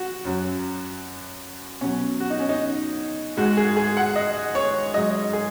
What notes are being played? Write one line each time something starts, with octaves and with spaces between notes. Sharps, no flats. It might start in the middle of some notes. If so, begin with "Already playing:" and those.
Already playing: F#4
F#2 F#3
B2 F#3 C#4
F#4
D#4
C#4
D#4
G#2 G#3 F#4
G#4
G#4
F#5
D#5
C#5
G#2 F#3 D#5
G#4